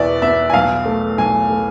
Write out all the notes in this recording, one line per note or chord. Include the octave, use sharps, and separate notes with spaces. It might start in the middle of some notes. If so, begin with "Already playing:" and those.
Already playing: E2 B2 B3 D5 E5
B3 E5
G#5
B1 F5
A3
B1 G#5
A3